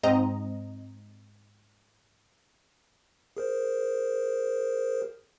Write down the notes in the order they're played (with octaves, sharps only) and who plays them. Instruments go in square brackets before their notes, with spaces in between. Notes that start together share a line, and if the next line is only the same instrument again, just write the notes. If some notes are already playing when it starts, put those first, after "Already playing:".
[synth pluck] G#2 C4 D#5 A#5
[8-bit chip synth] G#4 A#4 C5